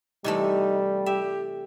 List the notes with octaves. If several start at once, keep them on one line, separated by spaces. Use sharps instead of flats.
C3 E3 G3 A3 D#4
G4 E5